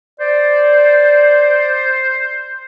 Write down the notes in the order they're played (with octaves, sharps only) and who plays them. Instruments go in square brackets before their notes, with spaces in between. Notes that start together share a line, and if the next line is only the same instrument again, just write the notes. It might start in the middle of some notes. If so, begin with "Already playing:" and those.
[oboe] C5 [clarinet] D5